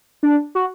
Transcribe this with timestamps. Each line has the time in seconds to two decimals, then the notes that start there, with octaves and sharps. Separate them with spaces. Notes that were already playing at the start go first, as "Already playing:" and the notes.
0.23 D4
0.55 F#4